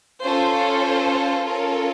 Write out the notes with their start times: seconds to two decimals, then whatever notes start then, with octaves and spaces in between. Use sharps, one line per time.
0.21 C#4 F4 A4 C5
0.53 C5
1.44 C#4 F4 A4 A#4